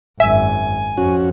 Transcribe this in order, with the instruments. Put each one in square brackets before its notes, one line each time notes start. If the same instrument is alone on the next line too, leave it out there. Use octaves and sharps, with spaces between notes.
[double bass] G#1 F#2 [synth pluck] E5 [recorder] G#5
[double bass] F2 [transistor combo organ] C#4 F#4